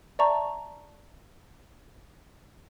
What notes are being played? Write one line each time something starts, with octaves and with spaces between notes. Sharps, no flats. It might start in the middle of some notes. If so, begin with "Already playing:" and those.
D5 E5 A5 A#5 C#6